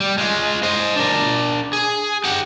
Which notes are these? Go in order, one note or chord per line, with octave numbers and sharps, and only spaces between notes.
G3
G#3 F4
C5 D#5
D4 A#4
G#4
G4 F#5